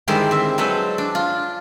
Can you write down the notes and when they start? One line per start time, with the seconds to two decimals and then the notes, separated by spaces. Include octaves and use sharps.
0.08 D3 D#3 G3 G#3 E4 C5
0.31 C4 E5
0.58 F#3 G#3 A4 B4 C5
0.98 D4
1.15 F4